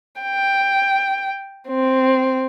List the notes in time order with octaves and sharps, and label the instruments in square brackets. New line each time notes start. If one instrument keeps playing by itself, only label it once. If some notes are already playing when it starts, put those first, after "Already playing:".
[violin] G5
C4